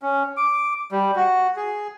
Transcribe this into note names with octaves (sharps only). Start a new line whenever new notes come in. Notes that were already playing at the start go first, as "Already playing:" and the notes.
C#4
D6
G3
F#4
G#4